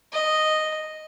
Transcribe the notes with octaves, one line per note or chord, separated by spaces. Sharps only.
D#5